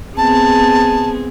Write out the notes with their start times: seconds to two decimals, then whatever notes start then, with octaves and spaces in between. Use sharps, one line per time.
0.17 B3 C4 G#4 A5